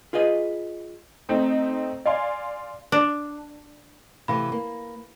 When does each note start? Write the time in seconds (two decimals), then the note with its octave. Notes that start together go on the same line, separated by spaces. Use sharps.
0.13 F4 G#4 B4 D#5
1.29 A3 C4 D#4
2.06 D5 F5 G#5 C6
2.92 D4
4.28 C3 E3 A3 F5 B5
4.52 A#3